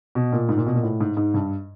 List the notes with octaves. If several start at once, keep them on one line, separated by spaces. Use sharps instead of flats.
B2
A#2
G#2
A#2
B2
A#2
A2
G#2
G#2
G2